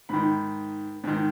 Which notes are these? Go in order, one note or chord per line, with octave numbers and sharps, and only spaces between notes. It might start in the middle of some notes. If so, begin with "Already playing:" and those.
G#2 D#3 B5
G#2 D#3